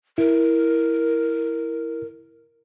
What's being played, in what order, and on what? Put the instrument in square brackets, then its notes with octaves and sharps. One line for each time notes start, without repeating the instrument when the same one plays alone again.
[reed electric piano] E4 [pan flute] A#4